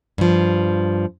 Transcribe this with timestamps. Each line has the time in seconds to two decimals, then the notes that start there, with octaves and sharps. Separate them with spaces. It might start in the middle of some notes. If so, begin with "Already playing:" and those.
0.18 G2 F3